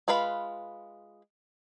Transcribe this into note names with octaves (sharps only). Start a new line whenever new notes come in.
G#3 F4 B4 F5 B5